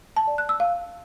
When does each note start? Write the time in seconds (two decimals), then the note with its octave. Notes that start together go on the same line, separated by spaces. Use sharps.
0.17 A5
0.27 D5
0.38 F#6
0.49 E6
0.60 F5